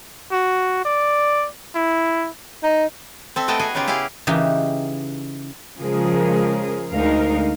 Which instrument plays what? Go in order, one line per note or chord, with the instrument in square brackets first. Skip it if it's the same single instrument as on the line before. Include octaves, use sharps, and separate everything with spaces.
[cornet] F#4
D5
E4
[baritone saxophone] D#4
[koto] C4 A4 E5
A3 B3 D#5 G5 A5
F#4 G#4 D#5 G#5
C#3 B3 D#4 F4 G4
E4 G4 G#4 F5
[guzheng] C#3 E3 D#4 G4
[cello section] C#3 F3 G#3 G#4 A#4
D2 G#3 D#4 A#4 F5